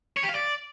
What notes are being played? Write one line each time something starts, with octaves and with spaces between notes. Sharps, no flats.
C#5
G4
F5
D5